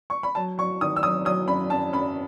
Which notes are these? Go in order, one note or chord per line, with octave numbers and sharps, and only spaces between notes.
C#6
B5
F#3 A5
F#3 C#6
D#3 D#6
E6
F#3 D#6
F#3 D#6
F#2 B5
F#2 A5
F#2 B5